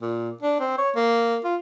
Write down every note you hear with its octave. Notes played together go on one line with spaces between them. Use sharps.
A#2
D4
C4
C#5
A#3
F4